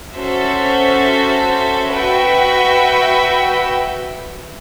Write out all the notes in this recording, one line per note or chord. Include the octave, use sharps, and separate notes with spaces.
C#4 F#4 A4 C5 E5
F#4 B4 E5 G5